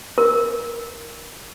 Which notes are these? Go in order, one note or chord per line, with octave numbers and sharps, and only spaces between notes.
A#4